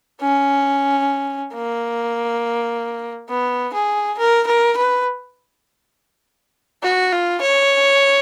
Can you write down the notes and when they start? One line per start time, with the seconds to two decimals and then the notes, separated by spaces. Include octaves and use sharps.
0.21 C#4
1.53 A#3
3.29 B3
3.73 G#4
4.18 A#4
4.47 A#4
4.77 B4
6.83 F#4
7.12 F4
7.41 C#5